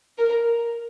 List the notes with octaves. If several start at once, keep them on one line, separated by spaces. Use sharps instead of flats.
A#4